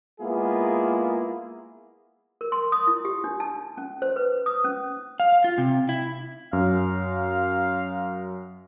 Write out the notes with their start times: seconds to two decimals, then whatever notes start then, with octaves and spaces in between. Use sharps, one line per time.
0.20 G#3 A#3 B3 E4 F4 G#4
2.41 A#4
2.52 C6
2.72 D#6
2.87 E4
3.05 G4
3.24 D4
3.40 A5
3.77 C#4
4.02 C5
4.16 B4
4.46 D#6
4.64 C#4
5.20 F5
5.44 F4
5.58 C3
5.89 E4
6.53 F#2 F5